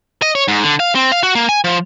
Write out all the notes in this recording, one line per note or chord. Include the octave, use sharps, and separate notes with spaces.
D#5
C#5
G#2
D3
F5
C4
F5
F#4
A#3
G#5
F3